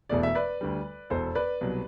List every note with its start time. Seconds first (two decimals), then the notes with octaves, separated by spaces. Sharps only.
0.09 E1 E2 B2 A3 D5
0.23 E5
0.35 B4 D5
0.61 D2 D3 G3
1.10 E1 E2 B2 A4 C5
1.35 B4 D5
1.61 C2 B2 F#3